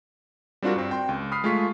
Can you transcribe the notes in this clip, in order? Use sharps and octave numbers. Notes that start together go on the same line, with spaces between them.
G3 C4 D4 F4 F#4 A#4
G2 C4
G5 C6
C#2
B5 D#6 F6 B6 C7
G#3 A3 F4 C#6 B6